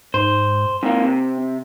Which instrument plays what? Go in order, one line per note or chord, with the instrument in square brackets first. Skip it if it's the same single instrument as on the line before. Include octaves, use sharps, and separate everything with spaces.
[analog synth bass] G#2 [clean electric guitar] C5
[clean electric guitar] G#2 A#3 [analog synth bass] C4
[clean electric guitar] C3